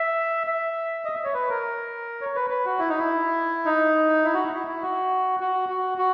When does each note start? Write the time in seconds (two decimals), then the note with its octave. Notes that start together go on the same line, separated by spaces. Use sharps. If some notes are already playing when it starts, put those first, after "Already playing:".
Already playing: E5
0.47 E5
1.05 D#5
1.15 E5
1.24 C#5
1.34 B4
1.49 A#4
2.21 C#5
2.36 B4
2.50 B4
2.65 F#4
2.79 E4
2.89 D#4
2.98 E4
3.66 D#4
4.24 E4
4.34 F#4
4.43 E4
4.53 E4
4.67 E4
4.82 F#4
5.40 F#4
5.69 F#4
5.98 F#4